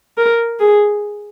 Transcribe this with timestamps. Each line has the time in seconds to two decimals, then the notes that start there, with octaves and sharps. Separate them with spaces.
0.18 A#4
0.60 G#4